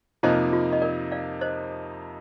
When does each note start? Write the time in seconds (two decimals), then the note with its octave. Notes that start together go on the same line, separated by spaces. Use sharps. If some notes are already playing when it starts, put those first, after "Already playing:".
0.23 F2 C3 F3 A#3 D#4 C5 D#5
0.53 F4
0.73 D#5
0.82 A#4 D5
1.12 D5 F5
1.41 C5 D#5